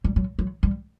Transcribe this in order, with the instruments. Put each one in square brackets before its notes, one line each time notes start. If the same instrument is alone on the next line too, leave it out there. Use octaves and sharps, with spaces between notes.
[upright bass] G3
F#3
F#3
G3